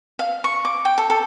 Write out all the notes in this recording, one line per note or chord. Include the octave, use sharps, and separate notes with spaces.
F5
C#6
D6
G5
A4
A4